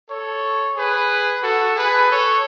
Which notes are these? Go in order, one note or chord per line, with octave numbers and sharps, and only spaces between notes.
A4 C#5
G#4 B4
F#4 A4
G#4 B4
A4 C#5